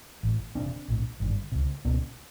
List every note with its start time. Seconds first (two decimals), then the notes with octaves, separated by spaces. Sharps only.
0.23 A1 A2
0.55 E1 E2 C3 C4 D4
0.88 A#1 A2
1.20 G#1 G2 D3
1.52 C#2 C3
1.85 C#2 B2 B3 C#4